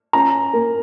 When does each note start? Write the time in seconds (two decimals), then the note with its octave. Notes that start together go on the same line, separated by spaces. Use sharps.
0.13 C#4 A#5
0.53 A#3